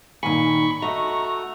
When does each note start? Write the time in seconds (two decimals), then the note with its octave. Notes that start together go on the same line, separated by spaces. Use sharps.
0.23 A#2 D#3 G#5 B5 C#6
0.82 A3 F#4 D#5 A#5